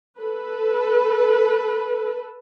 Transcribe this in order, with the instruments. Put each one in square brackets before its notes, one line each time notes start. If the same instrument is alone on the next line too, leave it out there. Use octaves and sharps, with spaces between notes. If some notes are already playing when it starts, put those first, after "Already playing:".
[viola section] A4 B4